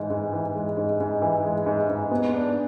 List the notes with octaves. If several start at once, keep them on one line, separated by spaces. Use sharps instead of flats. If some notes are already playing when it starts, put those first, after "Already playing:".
Already playing: G#2 E3 G#3
G#2
E3
G#3
G#2
G#2
E3
G#3
G#2
G#2
B3
D4